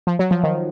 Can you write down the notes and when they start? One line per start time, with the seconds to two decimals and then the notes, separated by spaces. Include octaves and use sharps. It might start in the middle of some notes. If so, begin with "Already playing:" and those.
0.07 F3
0.19 F#3
0.31 F3
0.43 D#3